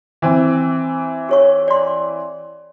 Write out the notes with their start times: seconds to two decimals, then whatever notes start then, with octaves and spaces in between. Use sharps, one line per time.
0.22 E3 C4
1.29 G4 C#5 C#6
1.68 D5 C6